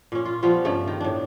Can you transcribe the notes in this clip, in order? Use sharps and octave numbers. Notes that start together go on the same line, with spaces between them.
A#2 C#4
F4
F3 G3 B3 F4
G2 C#3 A3
D#3
A2 D4